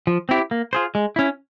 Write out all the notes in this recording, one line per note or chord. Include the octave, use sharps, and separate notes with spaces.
F3
C4 E4 G4
A#3
F4 G#4 C5
G#3
C#4 E4